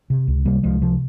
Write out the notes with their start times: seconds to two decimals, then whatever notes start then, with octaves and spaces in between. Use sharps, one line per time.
0.10 C3
0.27 C#2
0.45 C3 G3 A#3
0.63 C#2 F3 G#3
0.81 C3 F3